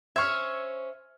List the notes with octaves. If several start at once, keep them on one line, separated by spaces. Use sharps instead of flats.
C#4 C5 E5 C#6 F6 G#6